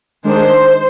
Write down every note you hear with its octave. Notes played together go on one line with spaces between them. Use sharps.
D#3 G#3 D4 C5